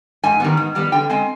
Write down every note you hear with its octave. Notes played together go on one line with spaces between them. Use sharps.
G#2 G#5
D#3 G3 B3
G#2
D#3 G3 B3
D3 G5
G#3 C4 G#5